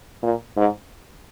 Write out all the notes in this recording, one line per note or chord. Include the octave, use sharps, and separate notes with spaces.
A#2
G#2